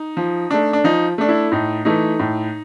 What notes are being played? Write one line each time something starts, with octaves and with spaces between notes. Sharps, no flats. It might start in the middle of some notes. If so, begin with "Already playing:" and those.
Already playing: D#4
F3
A3 D4
D4
F3 D#4
A3 D4
E4
A2 D#4
E3 A3 D#4
A2